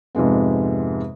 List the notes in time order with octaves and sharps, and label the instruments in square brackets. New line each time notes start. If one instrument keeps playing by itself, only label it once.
[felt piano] F2 G#2 C3 G#3 B3